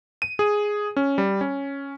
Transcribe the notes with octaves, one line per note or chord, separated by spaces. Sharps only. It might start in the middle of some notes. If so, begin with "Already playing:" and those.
D#7
G#4
C#4
G3
C#4